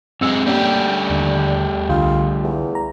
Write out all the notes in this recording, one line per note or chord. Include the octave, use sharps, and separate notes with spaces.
F#2 G#3 C4 E6 C#7
G3 A3 A#3 C#4 D4 G4
D#2 D3
C2 D3 F4
E2
A#5